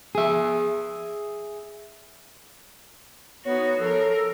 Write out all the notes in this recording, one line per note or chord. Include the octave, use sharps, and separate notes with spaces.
G#4 E5
B3 D#4 F#4 C#5
F3 A4 A#4